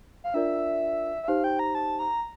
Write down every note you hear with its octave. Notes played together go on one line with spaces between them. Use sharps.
F5
D4 F4 A#4 D5 E5
E5
D#4 G4 C5 F5
G5
A#5
A5
A#5